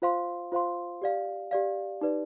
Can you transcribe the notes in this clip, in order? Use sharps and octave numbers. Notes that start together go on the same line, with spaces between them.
F4 C5 F5 C6
F4 C5 F5 C6
G4 D5 F5
G4 D5 F5
D#4 G4 B4 D5